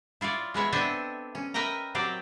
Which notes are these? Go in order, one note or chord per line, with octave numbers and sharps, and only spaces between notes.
E4 F4 C#5 D5
G#3 B3 E4 C#5
B3 C4 D4 A4 D#5 E5
C#4
A#4 B4 D#5 E5 G5 A#5
F#3 C4 G4 D5